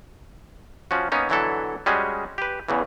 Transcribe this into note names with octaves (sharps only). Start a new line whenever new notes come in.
F3 C#4 F#4
A#3 B3 C#4 D#4
B2 D3 E3 F#3 E4 A4
G3 G#3 C#4 F#4 G#4
G4 B4
E2 C#3 E3